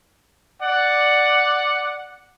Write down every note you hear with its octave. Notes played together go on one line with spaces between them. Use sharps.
D5 F#5